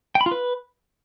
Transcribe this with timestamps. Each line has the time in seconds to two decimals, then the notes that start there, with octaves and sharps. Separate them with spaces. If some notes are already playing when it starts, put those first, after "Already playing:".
0.15 G5
0.21 B5
0.26 F4
0.31 B4